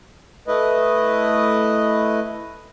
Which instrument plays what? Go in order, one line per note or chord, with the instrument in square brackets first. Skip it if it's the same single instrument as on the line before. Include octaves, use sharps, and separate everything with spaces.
[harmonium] A3 E4 B4 D#5